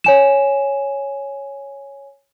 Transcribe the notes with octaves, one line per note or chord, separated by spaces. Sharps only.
C#5 G#5 E7